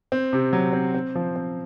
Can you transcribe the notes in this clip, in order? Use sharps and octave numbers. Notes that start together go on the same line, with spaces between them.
C4
C3
F#3
C4
C4
F3
C4